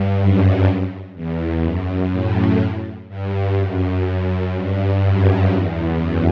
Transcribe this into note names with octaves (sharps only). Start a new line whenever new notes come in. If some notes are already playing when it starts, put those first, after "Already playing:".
Already playing: G2
F#2
E2
F#2
A2
G2
F#2
G2
F#2
E2
F#2